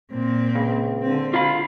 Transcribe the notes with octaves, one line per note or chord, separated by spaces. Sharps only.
A#2 C4
C#2
D3 C4
D3 F4 F5 B5